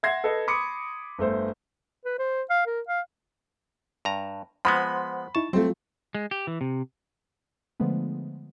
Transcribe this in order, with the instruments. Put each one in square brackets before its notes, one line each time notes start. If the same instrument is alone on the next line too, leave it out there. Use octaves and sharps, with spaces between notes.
[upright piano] E5 F#5 C6 G#6 A#6 C7
A4 B4 D#5
B5 C6 D6 D#6 C#7
G1 A3 C5
[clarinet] B4
C5
F5
A#4
F5
[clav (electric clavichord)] G2 A#5
[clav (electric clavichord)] F3 G#3 B3 [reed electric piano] C5 F#5 C6 [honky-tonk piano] B5
[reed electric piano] D#4 E4 C#6 [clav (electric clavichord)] A5
[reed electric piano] F#3 G3 F4 [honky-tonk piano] A3 C4
[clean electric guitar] G#3
G4
E3
C3
[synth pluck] D3 F3 G#3 A3 B3